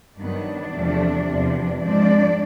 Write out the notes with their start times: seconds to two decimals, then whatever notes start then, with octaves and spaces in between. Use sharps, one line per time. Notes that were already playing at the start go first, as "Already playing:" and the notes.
0.18 G2 D#3 F#3 B3 D4 D5
0.72 E2 C3 F3 A3
1.27 E2 C3 F3
1.82 G#2 F3 G#3 C4 D4 D5